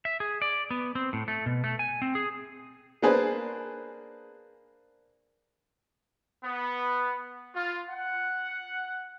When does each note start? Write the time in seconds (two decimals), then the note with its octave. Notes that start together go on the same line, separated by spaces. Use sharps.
0.05 E5
0.20 G#4
0.42 D5
0.70 B3
0.95 C4
1.13 A2
1.28 A3
1.46 B2
1.64 A3
1.79 G#5
2.02 C4
2.15 G#4
3.02 A#3 D4 G#4 B4 C5 G#5
6.43 B3
7.54 F4
7.90 F#5